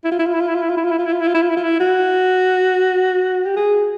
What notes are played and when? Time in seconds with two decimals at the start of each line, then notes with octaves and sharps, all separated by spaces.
0.04 E4
0.11 F4
0.19 E4
0.26 F4
0.33 E4
0.41 F4
0.48 E4
0.55 F4
0.62 E4
0.69 F4
0.77 E4
0.84 F4
0.91 E4
0.99 F4
1.06 E4
1.13 F4
1.20 E4
1.27 F4
1.34 E4
1.42 F4
1.49 E4
1.57 F4
1.63 E4
1.80 F#4
3.46 G4
3.56 G#4